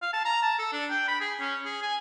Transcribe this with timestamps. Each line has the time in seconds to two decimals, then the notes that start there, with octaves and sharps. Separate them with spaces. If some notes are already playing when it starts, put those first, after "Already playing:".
0.02 F5
0.13 A5
0.25 A#5
0.43 A5
0.59 A4
0.73 D4
0.90 G5
1.08 B5
1.20 G#4
1.40 C#4
1.65 G#4
1.82 G#5